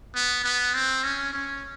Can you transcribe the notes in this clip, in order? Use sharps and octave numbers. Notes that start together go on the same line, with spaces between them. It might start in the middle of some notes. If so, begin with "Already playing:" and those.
B3
B3
C4
C#4
C#4